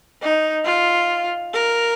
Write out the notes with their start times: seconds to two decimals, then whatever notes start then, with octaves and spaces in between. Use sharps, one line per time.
0.22 D#4
0.65 F4
1.54 A#4